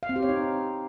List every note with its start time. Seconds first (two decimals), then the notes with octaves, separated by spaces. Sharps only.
0.03 F5
0.09 C4
0.16 G4
0.22 C#5
0.29 D#4